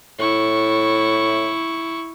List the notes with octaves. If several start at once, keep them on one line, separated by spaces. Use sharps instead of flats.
A2 E4 C#6